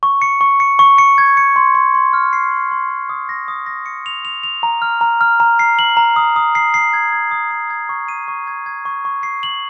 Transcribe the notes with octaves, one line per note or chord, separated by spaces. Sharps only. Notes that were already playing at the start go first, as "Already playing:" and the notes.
C#6
C#7
C#6
C#7
C#6
C#7
G#6
C#7
C6
C6
C6
F6
C7
C6
C6
C6
D#6
A#6
D#6
A#6
C#7
F7
F7
F7
A#5
F6
A#5
F6
A#5
C7
F#7
A#5
D#6
D#6
C7
C7
G#6
G#6
D#6
D#6
G#6
C#6
D#7
C#6
G#6
G#6
C#6
C#6
C7
F#7